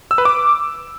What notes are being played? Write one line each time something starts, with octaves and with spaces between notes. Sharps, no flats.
E6
B4
D6